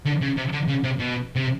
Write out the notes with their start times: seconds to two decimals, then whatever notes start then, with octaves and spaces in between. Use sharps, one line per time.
0.06 D3
0.22 C#3
0.37 C3
0.53 D3
0.68 C#3
0.84 C3
1.00 B2
1.36 C3